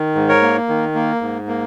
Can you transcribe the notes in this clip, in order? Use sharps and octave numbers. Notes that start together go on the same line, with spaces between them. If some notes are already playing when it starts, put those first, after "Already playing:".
Already playing: D#3
G#2
A#4 C#5
A#3
D#3
A#3
G#2
A#3